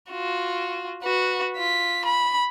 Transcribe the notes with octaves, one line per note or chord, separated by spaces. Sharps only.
F4 F#4
F#4 B4
F4 B6
B5